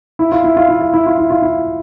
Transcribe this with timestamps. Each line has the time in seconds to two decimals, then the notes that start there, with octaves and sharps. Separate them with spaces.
0.19 E4
0.32 F4
0.44 E4
0.57 F4
0.69 E4
0.81 F4
0.94 E4
1.06 F4
1.18 E4
1.30 F4
1.42 E4